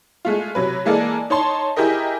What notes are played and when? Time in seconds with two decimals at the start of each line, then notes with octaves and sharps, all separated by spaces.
0.25 G#3 A3 F4
0.55 C3 F#3 B4
0.85 E3 G#3 A#3 A4 A#4 D5
1.30 D#4 C#5 A5 C6
1.76 E4 G4 G#4 A#4 D#5